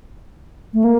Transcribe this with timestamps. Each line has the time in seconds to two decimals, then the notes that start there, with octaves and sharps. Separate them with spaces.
0.74 A3
0.84 A#3